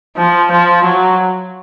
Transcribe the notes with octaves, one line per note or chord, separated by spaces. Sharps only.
F3
F3
F#3